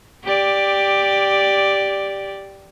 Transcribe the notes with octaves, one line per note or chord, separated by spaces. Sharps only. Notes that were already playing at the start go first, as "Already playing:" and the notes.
G4 D5